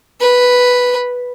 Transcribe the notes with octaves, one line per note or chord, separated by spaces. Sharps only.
B4